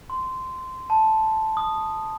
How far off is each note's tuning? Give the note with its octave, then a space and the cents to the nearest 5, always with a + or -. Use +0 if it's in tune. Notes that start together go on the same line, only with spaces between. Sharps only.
C6 -15
A5 -5
D#6 -10